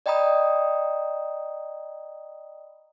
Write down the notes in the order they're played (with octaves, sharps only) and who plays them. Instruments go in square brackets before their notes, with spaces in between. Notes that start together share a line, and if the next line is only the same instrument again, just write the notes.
[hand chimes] D5 D#5 G5 A#5 B5 D#6